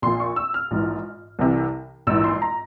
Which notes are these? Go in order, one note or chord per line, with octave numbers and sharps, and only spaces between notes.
A#1 A#2 C6
C#6
E6
F6
A#1 G#2 E3
C2 C3 E3
A#1 G#2 E3 E6
C6
A#5